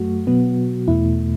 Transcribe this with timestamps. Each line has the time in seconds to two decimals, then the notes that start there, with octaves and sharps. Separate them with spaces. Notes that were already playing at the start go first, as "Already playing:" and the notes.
Already playing: F#2 F#3 A3 F#4
0.27 B2 F#3 B3
0.88 E2 B2 A3 E4